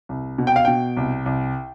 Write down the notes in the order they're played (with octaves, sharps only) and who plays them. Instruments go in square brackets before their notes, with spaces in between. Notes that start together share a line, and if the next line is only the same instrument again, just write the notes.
[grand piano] C2
B2
G5
F5
B2 G5
C2
C2